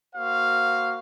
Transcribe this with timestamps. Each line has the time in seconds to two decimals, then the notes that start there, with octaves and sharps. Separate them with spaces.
0.15 A#3 F#4 C5 F5